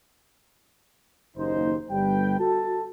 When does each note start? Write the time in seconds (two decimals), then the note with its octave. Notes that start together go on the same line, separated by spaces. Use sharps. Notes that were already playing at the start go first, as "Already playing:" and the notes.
1.37 F#1 D#2 D#4 C5
1.91 G1 G3 B4 G5
2.40 F#4 A4 A5